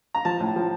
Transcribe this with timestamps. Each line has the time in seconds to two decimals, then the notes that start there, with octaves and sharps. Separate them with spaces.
0.15 A#5
0.25 F3 A5
0.40 A2
0.56 F3